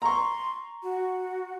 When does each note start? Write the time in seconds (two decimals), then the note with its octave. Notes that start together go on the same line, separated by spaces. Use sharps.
0.02 A#5 C6 C#6
0.83 F#4